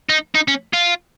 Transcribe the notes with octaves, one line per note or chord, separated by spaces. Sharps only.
D#4
D#4
C#4
F4